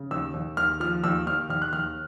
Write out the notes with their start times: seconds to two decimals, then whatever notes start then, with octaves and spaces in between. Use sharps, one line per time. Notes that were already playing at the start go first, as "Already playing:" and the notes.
Already playing: C#3
0.11 D#2 E6
0.34 D#2
0.57 D#2 F6
0.80 F3 F6
1.04 D#2 E6
1.27 D#2 F6
1.50 D#2 F6
1.62 F#6
1.73 D#2 F6